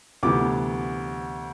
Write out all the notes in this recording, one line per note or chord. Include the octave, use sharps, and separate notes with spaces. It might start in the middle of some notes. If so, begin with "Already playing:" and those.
D2 C3 E3 B3 D6